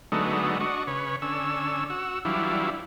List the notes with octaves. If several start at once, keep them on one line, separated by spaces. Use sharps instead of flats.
D3 F#3 G#3 A3 B3 D#4
D4 F#4 D#5 C#6
C#3 B4 C#5
D3 C#4 E6
F#4 E6
E3 F#3 G3 D4 E4 F4